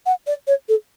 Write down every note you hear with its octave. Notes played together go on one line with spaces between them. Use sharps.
F#5
D5
C#5
A4